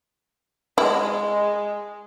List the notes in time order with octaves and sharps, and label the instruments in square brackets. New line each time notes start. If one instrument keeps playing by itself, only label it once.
[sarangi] G#3 [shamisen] E4